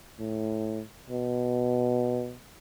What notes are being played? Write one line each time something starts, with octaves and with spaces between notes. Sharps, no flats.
A2
B2